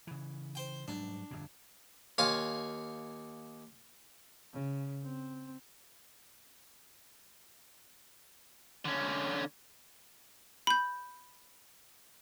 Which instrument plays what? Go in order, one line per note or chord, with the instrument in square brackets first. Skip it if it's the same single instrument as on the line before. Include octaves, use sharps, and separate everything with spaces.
[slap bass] C#3 E3
[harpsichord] C5 G5
[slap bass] G#2 F#3 G3 [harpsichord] D4
[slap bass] G1 F2 A#2
[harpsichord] D#2 C#5 F5 G#5 C6
[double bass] C#3
C4
[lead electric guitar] D3 C#4
[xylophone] B5 G6